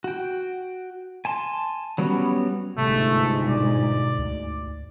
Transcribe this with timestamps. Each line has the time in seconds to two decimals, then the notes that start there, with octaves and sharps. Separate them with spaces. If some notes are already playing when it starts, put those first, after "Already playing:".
0.04 F#4 G5
1.25 G#5 A5 C6
1.98 F#3 G3 B3 C#4 F#4
2.78 G1 G#2 C3 A3
3.49 B2 D5
4.18 D2